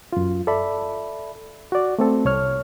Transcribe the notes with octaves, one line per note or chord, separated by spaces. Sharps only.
F#2 F4
A4 D5 E5 B5
F#4 D5
A3 C4 A4
C2 C#5 F6